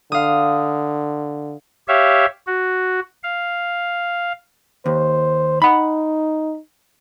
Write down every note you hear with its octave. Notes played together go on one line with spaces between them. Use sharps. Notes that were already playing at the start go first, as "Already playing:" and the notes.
D3 F5 D#6
G4 C#5 E5 F5
F#4
F5
D#2 C5
D#4 F#5 B5